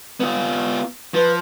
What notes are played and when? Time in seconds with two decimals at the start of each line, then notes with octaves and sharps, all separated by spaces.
0.20 B3 F4
1.14 F3 B4